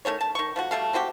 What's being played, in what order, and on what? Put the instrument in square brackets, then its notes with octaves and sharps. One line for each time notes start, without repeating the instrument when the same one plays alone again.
[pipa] D#3 A3 C#4 C#5
A5
D#3 C#6
F3 A3 F#4
G3 A3 A4 F5
G#3 C4 F#4 G4